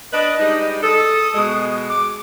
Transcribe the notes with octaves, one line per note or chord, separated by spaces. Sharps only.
D4 B4 D#5
G3 G#3 D#4
A4 D#6
B2 G#3
D6